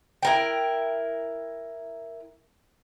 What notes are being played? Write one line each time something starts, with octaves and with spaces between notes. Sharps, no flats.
E4 A#4 G5